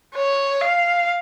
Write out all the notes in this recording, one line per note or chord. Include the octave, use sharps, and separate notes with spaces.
C#5
F5